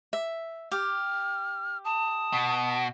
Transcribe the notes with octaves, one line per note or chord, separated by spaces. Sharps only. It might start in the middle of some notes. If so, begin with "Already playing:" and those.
E5
G4 F6
A5 D#6
B2